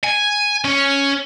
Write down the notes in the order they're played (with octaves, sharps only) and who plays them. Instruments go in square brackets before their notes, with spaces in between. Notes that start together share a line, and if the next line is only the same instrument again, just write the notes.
[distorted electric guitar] G#5
C#4